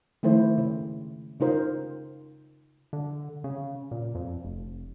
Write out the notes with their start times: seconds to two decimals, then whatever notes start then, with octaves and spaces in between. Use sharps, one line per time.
0.23 D#3 F3 A3 E4 C5
0.58 C#3
1.40 C#3 D#4 F4 A#4 C5
2.93 D3
3.44 C#3
3.91 A#2
4.15 F2
4.45 F1